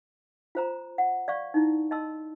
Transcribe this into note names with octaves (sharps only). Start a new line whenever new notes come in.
F4 C5 A#5
F#5
D5 F5 C#6
D#4 E4
D#5 A5 C6 E6